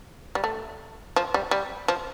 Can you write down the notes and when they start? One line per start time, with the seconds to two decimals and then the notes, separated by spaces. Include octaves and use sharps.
0.35 G3
0.44 A3
1.16 F3
1.34 G3
1.51 G3
1.88 F3